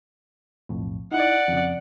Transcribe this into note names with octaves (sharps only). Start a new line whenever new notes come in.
B1 F2 A2
D#4 E4 D5 F#5
F2 C#3